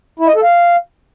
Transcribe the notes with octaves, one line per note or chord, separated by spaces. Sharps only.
E4
D#5
A4
F5